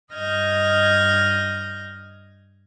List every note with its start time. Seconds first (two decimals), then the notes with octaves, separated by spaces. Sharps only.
0.13 G2 D#5 F6 G6 G#6 A#6